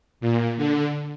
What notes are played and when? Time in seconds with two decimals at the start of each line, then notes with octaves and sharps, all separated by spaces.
0.21 A#2
0.57 D3